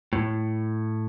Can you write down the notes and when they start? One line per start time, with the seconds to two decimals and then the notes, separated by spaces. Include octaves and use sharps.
0.13 A2